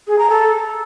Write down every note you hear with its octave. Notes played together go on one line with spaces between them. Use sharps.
G#4
A#5
A4